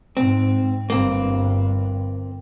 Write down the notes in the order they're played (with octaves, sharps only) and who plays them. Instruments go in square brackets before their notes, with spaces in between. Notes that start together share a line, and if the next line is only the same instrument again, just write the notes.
[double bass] G#2 [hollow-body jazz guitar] C4
[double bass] G1 G2 [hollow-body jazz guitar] A#3 C4